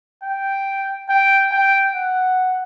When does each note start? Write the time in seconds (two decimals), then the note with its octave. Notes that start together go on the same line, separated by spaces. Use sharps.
0.23 G5
1.09 G5
1.52 G5
1.95 F#5